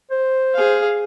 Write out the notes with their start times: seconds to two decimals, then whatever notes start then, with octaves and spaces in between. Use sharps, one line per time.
0.11 C5
0.54 G#4 F5